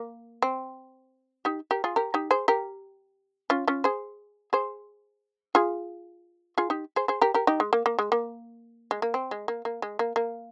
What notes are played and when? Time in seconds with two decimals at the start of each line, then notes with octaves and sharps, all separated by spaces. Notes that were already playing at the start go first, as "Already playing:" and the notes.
Already playing: A#3
0.42 C4
1.45 D#4 G4
1.71 G4 A#4
1.84 F4 G#4
1.96 G4 A#4
2.14 D#4 G4
2.31 G#4 C5
2.48 G4 A#4
3.50 C#4 F4
3.67 C#4 F4
3.84 G#4 C5
4.53 G#4 C5
5.55 F4 G#4
6.58 F4 G#4
6.70 D#4 G4
6.96 G#4 C5
7.08 G#4 C5
7.21 G4 A#4
7.34 G4 A#4
7.47 D#4 G4
7.60 G#3
7.73 A#3
7.86 A#3
7.99 G#3
8.12 A#3
8.91 G#3
9.02 A#3
9.14 C4
9.31 G#3
9.48 A#3
9.65 A#3
9.82 G#3
9.99 A#3
10.16 A#3